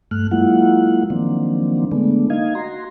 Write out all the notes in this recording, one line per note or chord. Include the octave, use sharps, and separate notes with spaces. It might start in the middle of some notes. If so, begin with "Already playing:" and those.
G2 A3 F6 F#6
F#3 G#3 A#3 E4 F4 F#5
D#3 F3 F#3 A#3 C4 D4
D3 G#3 A3 B3 D4
A#3 D#4 D#5 F5 G#6
F#4 A#5 C6